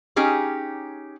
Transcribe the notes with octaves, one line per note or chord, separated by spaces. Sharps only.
C#4 D#4 G4 G#4